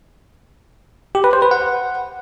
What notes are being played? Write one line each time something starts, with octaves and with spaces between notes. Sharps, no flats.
G4
B4
C5
B4
F#5